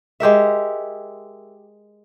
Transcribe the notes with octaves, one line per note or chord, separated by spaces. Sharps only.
G#3 G4 A#4 E5